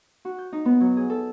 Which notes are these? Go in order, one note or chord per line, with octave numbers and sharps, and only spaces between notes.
F#4
G6
D#4
B3
F#3
G#4
A4